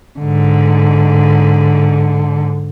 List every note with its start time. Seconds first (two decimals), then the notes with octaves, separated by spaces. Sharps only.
0.20 G#2 D3